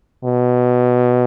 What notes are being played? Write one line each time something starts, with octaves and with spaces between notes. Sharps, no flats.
B2